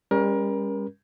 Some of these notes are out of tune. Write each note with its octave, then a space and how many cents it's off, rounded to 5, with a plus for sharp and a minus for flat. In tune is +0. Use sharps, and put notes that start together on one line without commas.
G3 +40 C#4 +0 A#4 +30